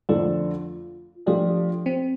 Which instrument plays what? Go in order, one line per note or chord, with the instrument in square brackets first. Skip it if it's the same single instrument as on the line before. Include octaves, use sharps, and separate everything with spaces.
[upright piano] F2 D3 A3 D4 A4 [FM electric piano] F4
[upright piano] F3 A3 D4 [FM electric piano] G4
[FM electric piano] C4